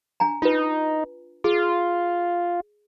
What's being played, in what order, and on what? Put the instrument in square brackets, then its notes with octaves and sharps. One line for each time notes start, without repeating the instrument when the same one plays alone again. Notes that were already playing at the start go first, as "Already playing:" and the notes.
[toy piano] D4 G#5 A#5
[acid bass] D#4 [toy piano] F4 B4
[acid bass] F4 [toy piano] G#4